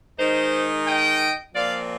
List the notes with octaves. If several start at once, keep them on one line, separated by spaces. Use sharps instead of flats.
D#3 G#3 D#4 C5 D#5
D#5 G5
A#2 F3 C4 D5 F5